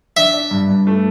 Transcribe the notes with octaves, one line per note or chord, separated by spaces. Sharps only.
D4 E5
D4
G2
G2
A3